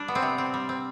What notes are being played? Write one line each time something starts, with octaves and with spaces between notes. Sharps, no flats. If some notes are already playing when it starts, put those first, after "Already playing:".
Already playing: G3 D4
B3
C4
C3
C4
G3
C4